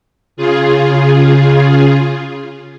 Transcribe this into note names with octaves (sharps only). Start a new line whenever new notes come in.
C#3 F4 G#4